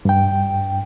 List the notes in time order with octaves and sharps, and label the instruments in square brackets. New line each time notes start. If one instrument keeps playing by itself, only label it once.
[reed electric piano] G2 G5